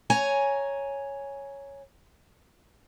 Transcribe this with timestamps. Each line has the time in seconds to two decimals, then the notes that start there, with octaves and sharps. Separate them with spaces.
0.10 C#5 G#5 A#5